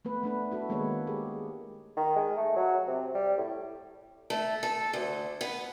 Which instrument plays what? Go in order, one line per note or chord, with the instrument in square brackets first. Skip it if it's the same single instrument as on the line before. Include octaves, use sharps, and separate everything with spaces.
[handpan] A3 B3 B4
A3 D4 B4
E4 F#4 A4
D#3 G#3 A#3 B3 B4 C#5
G4 G#4 A#4
[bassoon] D#3
G#3
A3
F#3
C3
G3
A2
[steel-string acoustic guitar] A3
A4
D2
B3